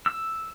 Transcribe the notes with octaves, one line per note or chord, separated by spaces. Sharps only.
E6